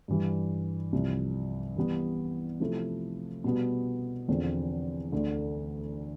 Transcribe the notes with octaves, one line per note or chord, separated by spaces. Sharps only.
G2 E3 G3
C2 C3 F3
E3 G3 B3
C3 F3 A3 E4 A4
B2 G3 B3
E2 D3 F3 C4
D2 D3 A3